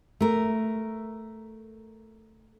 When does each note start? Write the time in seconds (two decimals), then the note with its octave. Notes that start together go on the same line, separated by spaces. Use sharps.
0.21 A3 A#4